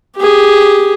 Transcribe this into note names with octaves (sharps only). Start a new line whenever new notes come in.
G4 G#4